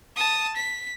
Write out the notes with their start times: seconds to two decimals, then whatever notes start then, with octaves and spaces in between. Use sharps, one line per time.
0.16 A5 D#6
0.56 B6